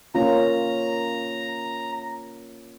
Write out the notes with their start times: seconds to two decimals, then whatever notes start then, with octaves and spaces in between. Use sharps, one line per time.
0.15 A#3 C#4 F4 A#5